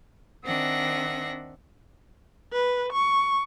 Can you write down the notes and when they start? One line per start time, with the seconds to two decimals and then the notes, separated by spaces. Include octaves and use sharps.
0.44 D#3 C4 D4 E5 F#5 A#6
2.53 B4
2.93 C#6